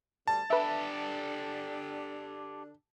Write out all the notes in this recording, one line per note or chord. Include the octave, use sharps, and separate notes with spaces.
D2 G3 D4 A5
D3 D4 G4 A4 B4 E5